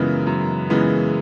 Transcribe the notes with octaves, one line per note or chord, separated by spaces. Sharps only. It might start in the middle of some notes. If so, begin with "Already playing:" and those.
Already playing: F#2 C#3 E3 G#3 B3 A#4
F#2
C#3 E3 G#3 B3